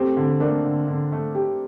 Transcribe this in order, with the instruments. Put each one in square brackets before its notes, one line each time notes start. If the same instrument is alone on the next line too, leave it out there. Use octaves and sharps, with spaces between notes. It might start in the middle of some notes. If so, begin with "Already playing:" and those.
Already playing: [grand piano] A3 C4 [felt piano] G4
[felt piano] D3
[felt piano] A3 [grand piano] A#3 D4
[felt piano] D3
D3
A3
G4